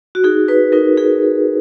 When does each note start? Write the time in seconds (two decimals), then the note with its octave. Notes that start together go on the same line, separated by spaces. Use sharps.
0.15 F#4
0.24 D#4 G#4
0.48 D#4 B4
0.72 D#4 A#4
0.97 D#4 G#4